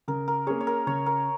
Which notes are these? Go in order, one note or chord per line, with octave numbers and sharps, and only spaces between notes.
C#3 A#4
A#4
A#3 C#4 G#4 C#5
C#5
A#4
C#3 C#5
A#4